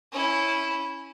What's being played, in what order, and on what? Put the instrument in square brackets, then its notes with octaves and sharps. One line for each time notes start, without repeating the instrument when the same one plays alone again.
[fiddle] C#4 E4